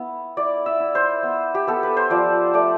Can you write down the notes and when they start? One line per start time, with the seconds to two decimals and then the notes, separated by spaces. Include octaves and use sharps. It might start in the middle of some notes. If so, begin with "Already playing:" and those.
Already playing: B3 E4
0.37 E4 D5
0.66 E5
0.80 E4
0.95 C5
1.23 B3
1.55 G4
1.67 B3 A4
1.83 B4
1.97 C5
2.10 F3 D5
2.54 A3 D5